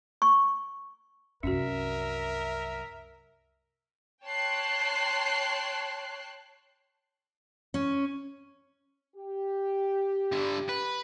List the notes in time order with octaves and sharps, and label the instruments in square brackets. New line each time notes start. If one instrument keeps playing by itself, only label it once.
[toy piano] C#6
[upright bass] C2 F#2 [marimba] C#4 F#4 [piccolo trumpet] A#4 [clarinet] E5
[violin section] C#5 G5 A5 C6 F#6 C7
[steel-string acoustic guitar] C#4
[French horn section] G4
[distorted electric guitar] G2 D3
B4